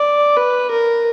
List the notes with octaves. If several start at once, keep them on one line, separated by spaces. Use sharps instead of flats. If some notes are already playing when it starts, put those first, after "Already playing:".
Already playing: D5
B4
A#4